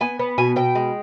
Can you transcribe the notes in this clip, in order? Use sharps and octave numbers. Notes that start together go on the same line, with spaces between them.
B3 G#5
B3
B2 G#5
B2 G5
G#3